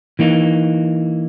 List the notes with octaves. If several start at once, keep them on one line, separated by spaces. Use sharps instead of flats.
E3 A#3 D#4